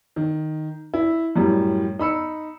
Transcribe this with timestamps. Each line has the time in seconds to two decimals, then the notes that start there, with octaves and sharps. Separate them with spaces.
0.16 D#3
0.94 E4
1.36 F#2 A2 G3
1.99 D#4 B5 E6 C#7